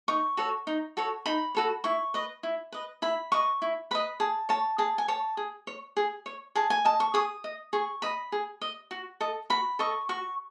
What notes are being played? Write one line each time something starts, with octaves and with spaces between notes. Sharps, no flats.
D#4 C#6
F#4 A4 C#5
D#4
F#4 A4 C#5
D#4 B5
F#4 A4 C#5
E4 C#6
B4 D#5
E4
B4 D#5
E4 B5
B4 D#5 C#6
E4
B4 D#5 B5
G#4 A5
C#5 A5
G#4 A5
G#5
C#5 A5
G#4
C#5
G#4
C#5
G#4 A5
G#5
D#5 A5
C#6
G#4 D#6
D#5
G#4 C#6
D#5 B5
G#4
D#5
F#4
A4 D#5
F#4 B5
A4 D#5 C#6
F#4 C#6